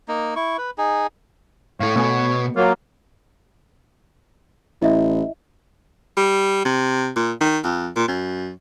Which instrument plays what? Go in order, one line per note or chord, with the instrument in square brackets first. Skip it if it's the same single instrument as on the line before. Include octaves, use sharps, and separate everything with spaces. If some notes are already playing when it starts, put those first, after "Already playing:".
[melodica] A#3 D#4
E4 C#6
B4
D#4 G#4
[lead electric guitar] A2 A3 [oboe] C#5 [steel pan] F5
[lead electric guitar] B2 [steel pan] A3 B3 G#5
[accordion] F#3 A#3 [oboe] F4
[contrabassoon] A1 [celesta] E4 D#5 E5
[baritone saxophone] G3
C3
A#2
D#3
F2
A#2
F#2